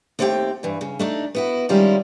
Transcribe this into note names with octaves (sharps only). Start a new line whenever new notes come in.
D#2 A3 C4 G4 F#5 G5
G2 E3
C#3
A3 D4 D#4
B3 E4 F#4
D#3 G3 G#3 C#4 E4 F4